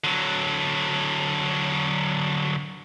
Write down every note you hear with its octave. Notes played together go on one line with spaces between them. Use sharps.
D3 F#3